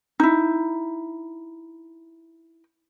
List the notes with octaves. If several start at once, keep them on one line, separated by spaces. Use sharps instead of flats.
D#4 E4